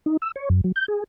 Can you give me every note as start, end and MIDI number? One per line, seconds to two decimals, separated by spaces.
0.06 0.17 63
0.22 0.32 88
0.36 0.49 73
0.50 0.61 42
0.64 0.72 54
0.76 0.86 91
0.88 1.04 68